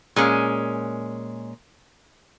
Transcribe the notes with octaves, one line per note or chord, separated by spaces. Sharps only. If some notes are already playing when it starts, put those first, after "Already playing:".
A#2 G#3 C#4